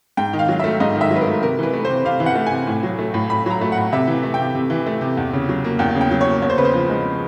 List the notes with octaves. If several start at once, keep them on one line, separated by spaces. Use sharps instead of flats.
G#2 G5
D#3
F5
F#3
A3 E5
G#2 D#5
D#3
E5
F#3
B4
A#4
A3
C3 A#4
E3 B4
A3
C3 C5
C3 F5
E3
F#5
A3
C3 G#5
A2
F#3
A3
A2
A2 B5
F#3 A#5
A3
A2 F#5
C3 E5
E3
A3
G5
C3
C3
E3
A3
C3
E2
C#3
F#3
A#3
E2 G5
C#3
G5
F#3
C#5
A#3
E2 C#5
C5
C#3 B4
C5
F3
G#3